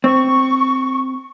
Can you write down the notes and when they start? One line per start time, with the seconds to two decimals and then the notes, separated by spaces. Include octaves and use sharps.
0.04 C4 C#6